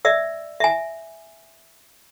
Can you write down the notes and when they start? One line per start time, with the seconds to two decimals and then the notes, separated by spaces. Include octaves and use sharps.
0.05 D5 E5 E6
0.60 E5 G#5